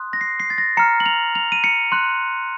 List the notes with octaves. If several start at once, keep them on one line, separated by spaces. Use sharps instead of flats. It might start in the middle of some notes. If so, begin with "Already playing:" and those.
Already playing: C6 D#6 F#6
A#6
C7
C7
A6
A#6
A#5 F6 C#7
F#7
F7
F7
D#7
C#7
C6 F#6